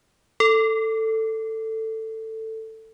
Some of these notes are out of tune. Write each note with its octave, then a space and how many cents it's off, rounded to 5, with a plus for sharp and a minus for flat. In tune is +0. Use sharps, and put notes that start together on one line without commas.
A4 +15